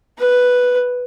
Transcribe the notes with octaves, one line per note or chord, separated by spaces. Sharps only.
B4